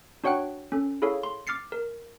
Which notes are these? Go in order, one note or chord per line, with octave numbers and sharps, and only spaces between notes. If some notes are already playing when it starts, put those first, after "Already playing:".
D4 F#4 C#5 F#5 G5 F#6
C#4 A4
E4 G#4 A4 C#5 F5
C6
D6 F6 A6 C7 C#7
A#4